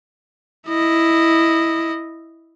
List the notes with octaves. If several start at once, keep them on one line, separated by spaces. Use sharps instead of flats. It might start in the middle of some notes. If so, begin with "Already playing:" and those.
E4 D#5